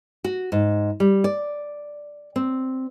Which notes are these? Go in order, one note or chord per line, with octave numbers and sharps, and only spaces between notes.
F#4
G#2
G3
D5
C4